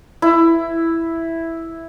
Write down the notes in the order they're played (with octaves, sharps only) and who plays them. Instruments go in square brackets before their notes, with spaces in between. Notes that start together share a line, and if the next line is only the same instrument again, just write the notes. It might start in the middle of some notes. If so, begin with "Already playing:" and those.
[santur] E4